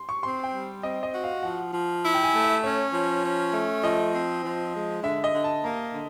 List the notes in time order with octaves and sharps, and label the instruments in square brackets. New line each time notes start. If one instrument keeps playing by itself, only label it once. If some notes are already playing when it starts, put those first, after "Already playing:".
Already playing: [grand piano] C6
C#6
[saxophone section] C4 [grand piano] C6
[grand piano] G5
[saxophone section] G3
[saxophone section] C4 [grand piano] D#5
[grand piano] D#5
[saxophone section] F#4
[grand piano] F5
[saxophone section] F3 [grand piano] F#5
[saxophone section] F3
E4
[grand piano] G5
G#5
[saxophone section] A3
[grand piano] E5
[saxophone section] C#4 [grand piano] C#5
[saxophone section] F3
C#4
A3
[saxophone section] F3 [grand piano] D#5
[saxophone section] C4
F3
G#3
[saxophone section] D3 [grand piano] E5
[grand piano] D#5
[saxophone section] D3
[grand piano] A5
[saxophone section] A#3 [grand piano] A#5
[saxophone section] D3